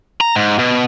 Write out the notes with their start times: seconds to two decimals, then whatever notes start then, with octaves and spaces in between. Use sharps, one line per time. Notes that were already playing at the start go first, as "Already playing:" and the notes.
0.21 A#5
0.36 G#2
0.59 B2